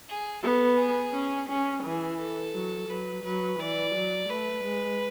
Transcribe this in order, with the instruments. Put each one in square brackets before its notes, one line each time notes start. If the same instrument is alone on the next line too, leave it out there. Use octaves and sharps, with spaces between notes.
[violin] G#4
[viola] B3 [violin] A4
[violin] G#4
[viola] C#4
[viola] C#4 [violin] G#4
[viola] E3 [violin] G#4
[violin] A4
[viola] F#3
[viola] F#3 [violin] B4
[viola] F#3 [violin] B4
[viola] E3 [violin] D5
[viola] F#3
[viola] A3 [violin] B4
[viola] G#3